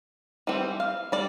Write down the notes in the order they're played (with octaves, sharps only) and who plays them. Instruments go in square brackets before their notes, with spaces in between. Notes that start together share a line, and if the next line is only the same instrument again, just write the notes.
[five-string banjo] E3 G3 C4
F5
G3 D5